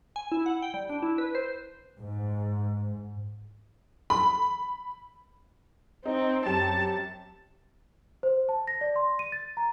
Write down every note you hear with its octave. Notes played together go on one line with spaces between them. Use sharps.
G#5
E4
F#5
G5
G3
D4
E4
B4
C5
G#2
B5
C4 D#4
F#2 G4 A5 E7
C5
A5
A#6
D5
C6
D#7
A6
A#5